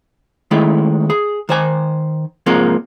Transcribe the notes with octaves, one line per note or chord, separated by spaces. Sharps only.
D#3 G#3 A3 E4
G#4
D#3 C5 G#5
G#2 C3 F3 G#3 A#3